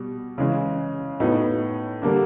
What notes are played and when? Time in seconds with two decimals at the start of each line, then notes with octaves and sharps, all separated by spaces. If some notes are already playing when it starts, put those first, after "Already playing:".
Already playing: B2 G3
0.38 C#3 E3 G#3
1.20 A2 F#3 B3 D#4
2.02 D3 G3 A#3 D4